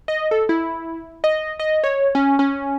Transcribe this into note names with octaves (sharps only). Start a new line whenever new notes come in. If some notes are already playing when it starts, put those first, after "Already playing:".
D#5
A4
E4
D#5
D#5
C#5
C#4
C#4